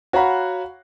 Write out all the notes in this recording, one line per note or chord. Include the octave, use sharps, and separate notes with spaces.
F#4 C#5 F5 F#5 A#5 B5